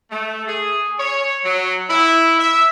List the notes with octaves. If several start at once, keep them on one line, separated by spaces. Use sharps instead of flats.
A3
G#4
C#5
F#3
E4
E5